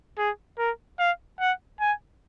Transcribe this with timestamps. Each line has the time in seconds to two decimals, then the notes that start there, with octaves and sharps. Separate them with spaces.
0.18 G#4
0.58 A#4
0.99 F5
1.40 F#5
1.80 G#5